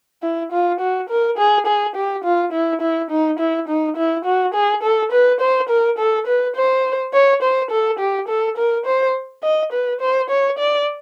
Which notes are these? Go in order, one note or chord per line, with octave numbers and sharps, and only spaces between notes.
E4
F4
F#4
A#4
G#4
G#4
G4
F4
E4
E4
D#4
E4
D#4
E4
F#4
G#4
A4
B4
C5
A#4
A4
B4
C5
C#5
C5
A4
G4
A4
A#4
C5
D#5
B4
C5
C#5
D5